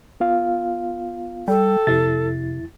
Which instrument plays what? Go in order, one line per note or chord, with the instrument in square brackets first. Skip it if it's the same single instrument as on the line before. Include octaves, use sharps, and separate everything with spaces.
[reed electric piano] B3 F4 F5
[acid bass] G3 [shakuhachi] A4 [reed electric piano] G5
[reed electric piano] F2 E4 A6 [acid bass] C3